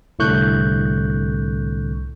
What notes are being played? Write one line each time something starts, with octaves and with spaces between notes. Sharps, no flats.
C2 A2 D3 C#6 F#6 G6